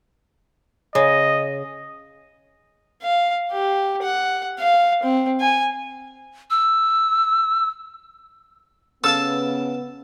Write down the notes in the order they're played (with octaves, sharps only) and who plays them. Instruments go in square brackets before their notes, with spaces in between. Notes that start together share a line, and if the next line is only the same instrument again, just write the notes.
[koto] C#3 [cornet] D#5
[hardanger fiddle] F5
G4
F#5
F5
C4
G#5
[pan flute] E6
[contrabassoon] C#3 [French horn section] B3 [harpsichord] A4 F5 A5 [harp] E6